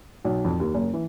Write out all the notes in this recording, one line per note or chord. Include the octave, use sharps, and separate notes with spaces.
B1
F2
D#2
F#1
E3